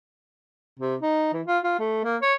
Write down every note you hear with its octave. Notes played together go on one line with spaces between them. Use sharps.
C3
D#4
E3
F4
F4
A3
A#3
C#5